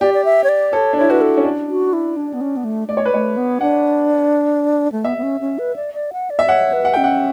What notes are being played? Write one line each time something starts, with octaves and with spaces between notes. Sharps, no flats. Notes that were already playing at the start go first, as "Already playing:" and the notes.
G4 D5
D5
E5
C#5
D5
A4 C#5
D4
E4 C#5
F#4 B4
A4
C#4
D4
F#4
E4
D4
B3
C#4
B3
A3
A3 D5
C#5
B4
A3 C#5
B3
D4 F#5
A3
B3 E5
B3
C#4
C#4
B4
D5
D5
F#5
D5
E5
C#5 F#5
B4
F#5
C#4 G5
F#5